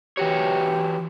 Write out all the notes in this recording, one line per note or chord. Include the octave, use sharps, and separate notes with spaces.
E3 F#4 G4 C#5